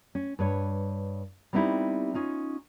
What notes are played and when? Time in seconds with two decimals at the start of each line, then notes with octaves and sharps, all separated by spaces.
0.15 C#4
0.39 G2 B4 C#5
1.53 G3 B3 C4 D#4 E4 G4
2.14 C#4 D#4 F4